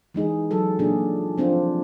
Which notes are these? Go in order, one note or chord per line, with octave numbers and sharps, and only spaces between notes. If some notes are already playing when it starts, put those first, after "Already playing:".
E3 G#3 D#4 G#4
F#3 A4
A#2 D4 G#4
F3 C4 D4 F4